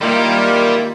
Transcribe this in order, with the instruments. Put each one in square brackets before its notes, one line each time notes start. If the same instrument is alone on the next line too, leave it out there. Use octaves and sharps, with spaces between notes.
[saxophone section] D#3 A#3 [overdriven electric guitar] G3 G4 [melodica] E4 F4